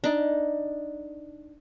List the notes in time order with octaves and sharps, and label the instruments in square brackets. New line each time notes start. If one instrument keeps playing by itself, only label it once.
[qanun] D4 D#4